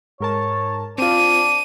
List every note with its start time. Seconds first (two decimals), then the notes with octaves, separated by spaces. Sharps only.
0.20 G#2 A#4 C#5 A5
0.98 C4 D4 F4 D#7